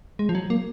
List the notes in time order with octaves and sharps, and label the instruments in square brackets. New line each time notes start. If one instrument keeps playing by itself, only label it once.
[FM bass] G#3
F3
F#3
A#3